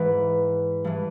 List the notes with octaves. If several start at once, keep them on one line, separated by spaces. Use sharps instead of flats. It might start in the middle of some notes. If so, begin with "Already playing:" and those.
Already playing: G#2 E3 B4
G2 E3